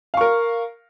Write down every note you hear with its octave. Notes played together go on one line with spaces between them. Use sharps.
A#4 F5 C#6